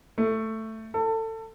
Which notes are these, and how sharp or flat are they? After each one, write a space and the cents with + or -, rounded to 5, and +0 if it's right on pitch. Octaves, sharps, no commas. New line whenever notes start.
A3 +5
A4 +25